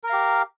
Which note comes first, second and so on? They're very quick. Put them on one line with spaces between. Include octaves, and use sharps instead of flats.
A#4 A#5 F5 G4